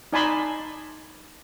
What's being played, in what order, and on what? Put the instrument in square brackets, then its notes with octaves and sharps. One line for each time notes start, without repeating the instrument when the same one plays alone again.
[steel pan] D#4 D5 G#5 A5 B5 C6